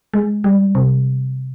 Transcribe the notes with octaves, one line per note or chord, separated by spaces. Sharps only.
G#3
G3
C3